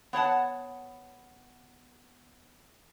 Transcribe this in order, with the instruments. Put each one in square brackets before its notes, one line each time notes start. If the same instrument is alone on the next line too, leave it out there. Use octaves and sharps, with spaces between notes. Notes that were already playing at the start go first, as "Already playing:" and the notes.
[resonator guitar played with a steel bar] B3 C#5 F#5 A5